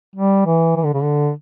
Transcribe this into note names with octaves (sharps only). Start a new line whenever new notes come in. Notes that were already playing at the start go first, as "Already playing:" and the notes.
G3
E3
E3
D3
C#3
D3